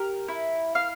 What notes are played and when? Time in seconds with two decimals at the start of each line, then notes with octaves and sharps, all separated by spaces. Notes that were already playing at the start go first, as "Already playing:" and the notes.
Already playing: G4 A#4
0.28 E4
0.75 F5